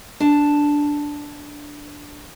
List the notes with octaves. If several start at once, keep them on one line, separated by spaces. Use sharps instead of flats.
D4 A5